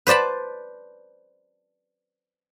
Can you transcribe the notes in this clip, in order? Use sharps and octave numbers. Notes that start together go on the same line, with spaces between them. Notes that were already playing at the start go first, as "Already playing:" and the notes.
B4 C5 D5 A5 B5